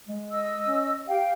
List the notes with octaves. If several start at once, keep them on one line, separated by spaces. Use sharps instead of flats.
G#3
D#5 E6
C#4
G4 F5 G5